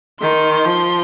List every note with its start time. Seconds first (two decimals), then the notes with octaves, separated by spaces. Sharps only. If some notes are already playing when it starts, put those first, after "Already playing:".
0.21 D#3 C6
0.65 F3